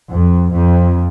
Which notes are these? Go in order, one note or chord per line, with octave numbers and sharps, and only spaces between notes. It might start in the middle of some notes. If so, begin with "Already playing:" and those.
F2
F2